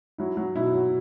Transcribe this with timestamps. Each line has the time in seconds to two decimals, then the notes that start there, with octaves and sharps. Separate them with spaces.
0.18 F#3 E4
0.37 F#3
0.56 B2 E4
0.74 F#3